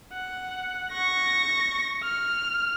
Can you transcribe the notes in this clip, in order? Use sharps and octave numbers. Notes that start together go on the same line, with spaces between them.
F#5
C#6 A#6
F6